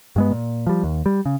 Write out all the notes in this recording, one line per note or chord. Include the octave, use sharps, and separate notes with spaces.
G2 G#3 B3
A#2
F3 G3
D#2
G3
C#3